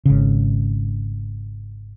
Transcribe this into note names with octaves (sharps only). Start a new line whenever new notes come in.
G#1 C#3